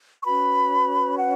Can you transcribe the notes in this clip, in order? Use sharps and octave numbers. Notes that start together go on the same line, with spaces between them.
C#6
C#4 F#4 B4 B5
F#5